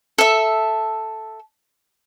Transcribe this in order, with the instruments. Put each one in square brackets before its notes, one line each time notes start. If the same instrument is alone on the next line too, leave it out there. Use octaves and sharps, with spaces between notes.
[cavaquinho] A4 E5